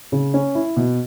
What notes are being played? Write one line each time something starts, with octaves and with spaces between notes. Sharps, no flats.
C#3
C#4
E4
B2